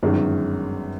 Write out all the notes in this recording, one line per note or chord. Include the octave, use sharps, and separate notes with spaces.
G1 F#2 D#3 G#3